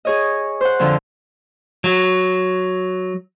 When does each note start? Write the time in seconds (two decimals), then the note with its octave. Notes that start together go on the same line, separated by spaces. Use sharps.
0.05 G#4 C#5 D#5
0.61 C5 F#5
0.79 F2 D3 F3
1.84 F#3